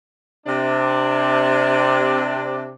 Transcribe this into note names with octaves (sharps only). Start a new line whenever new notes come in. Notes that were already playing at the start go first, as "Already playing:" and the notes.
C3 D4